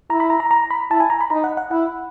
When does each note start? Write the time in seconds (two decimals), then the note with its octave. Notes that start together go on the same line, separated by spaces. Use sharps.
0.10 E4 A#5
0.20 B5
0.30 A#5
0.40 A#5
0.51 A#5
0.71 B5
0.91 E4 A5
1.00 G#5
1.10 A#5
1.21 B5
1.30 D#4 A#5
1.44 F#5
1.57 F#5
1.71 E4 F#5